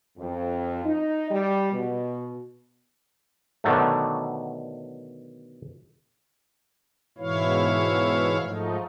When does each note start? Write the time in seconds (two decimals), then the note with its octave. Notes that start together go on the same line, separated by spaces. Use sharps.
0.18 F2
0.85 D#4
1.30 G3
1.72 B2
3.64 B2 D3 D#3 F#3 A3
7.18 G#2 B2 E3 E4 C#5 F5
8.39 G#2 F3 A3 D#4